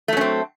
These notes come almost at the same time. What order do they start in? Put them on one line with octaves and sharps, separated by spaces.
A3 F#3 C#4 C4